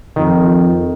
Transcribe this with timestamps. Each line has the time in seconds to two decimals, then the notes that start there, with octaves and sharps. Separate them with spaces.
0.16 F2 D#3